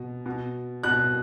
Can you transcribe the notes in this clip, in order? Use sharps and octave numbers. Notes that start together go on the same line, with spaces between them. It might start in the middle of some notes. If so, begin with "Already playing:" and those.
Already playing: B2
B2
B2 F#6